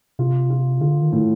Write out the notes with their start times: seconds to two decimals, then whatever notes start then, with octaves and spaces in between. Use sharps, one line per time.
0.19 C3 F4
0.50 F4
0.81 D3 F4
1.01 D#3
1.12 A2